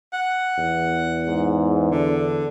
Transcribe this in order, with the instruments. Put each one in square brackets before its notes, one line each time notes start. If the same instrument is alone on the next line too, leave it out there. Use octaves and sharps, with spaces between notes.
[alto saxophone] F#5
[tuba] E2
[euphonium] G#2
[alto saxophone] D3 [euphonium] D4